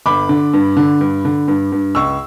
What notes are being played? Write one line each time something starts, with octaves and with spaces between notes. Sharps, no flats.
G1 B5 D6
D3
G2
D3
G2
D3
G2
G2
C#2 C#6 E6